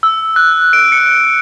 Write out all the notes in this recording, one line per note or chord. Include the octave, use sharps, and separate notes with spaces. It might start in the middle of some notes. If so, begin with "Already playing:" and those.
E6
F#6
D7
C#7